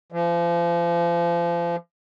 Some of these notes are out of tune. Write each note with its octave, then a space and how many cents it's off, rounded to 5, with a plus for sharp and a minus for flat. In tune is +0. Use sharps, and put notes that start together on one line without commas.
F3 -35